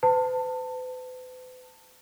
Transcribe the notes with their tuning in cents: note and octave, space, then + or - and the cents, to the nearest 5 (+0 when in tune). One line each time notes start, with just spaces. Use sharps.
B4 +45 A5 +25